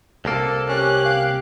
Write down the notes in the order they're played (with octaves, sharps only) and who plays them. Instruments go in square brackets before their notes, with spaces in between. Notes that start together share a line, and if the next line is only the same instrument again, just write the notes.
[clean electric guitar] C2 A#3 [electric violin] A4
[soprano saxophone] C#4 [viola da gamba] G4 [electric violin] F#6
[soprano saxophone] F5